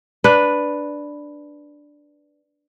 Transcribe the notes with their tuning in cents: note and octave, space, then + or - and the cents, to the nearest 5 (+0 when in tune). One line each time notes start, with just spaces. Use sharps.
D4 +0 B4 +0